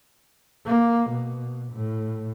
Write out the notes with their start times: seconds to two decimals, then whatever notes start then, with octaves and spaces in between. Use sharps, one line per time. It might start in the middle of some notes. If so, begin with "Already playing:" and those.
0.67 A#3
1.10 B2
1.72 A2